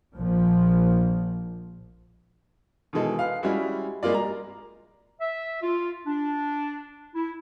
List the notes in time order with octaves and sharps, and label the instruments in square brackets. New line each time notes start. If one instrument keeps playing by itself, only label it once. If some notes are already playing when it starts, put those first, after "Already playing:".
[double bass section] A#1 A#2 F3
[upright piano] B2 D#3 E3 G#3 A4
B4 F5
G3 G#3 C#4 E4 F#4
G3 G#3 A#3 F4 D5
A#5
[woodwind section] E5
F4
D4
E4